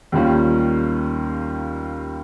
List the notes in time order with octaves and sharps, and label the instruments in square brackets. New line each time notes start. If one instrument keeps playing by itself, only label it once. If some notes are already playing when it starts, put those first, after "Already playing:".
[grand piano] D#2 D#3 G3 C#4 F4